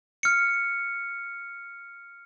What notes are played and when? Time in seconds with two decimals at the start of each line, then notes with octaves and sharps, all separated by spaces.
0.23 F6 C#7